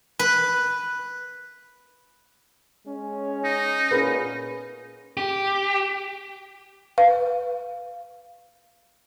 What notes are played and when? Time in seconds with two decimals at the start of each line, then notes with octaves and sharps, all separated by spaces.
0.19 B4
2.86 G#3 C#4
3.44 D#4
3.91 A#2 C#4 G#4 A#4 B4
5.17 G4
6.98 B4 F5